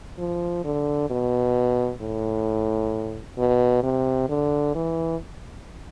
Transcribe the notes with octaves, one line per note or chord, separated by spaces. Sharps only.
F3
D3
B2
A2
B2
C3
D3
E3